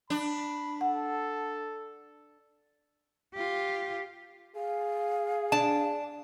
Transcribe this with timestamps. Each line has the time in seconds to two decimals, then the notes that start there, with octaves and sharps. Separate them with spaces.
0.10 D4 B5
0.81 A4 F#5
3.34 F4 G4
4.56 G#4 F5
5.52 D4 A5